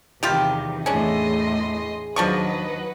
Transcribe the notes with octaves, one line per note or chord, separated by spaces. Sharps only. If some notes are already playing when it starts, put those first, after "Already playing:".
E2 C3 D#3 G3 F4 G4 G5
E2 A2 C#4 D4 G#4 D#5 C6
D#2 F3 F#3 D4 B4 D#5 F#5 C#6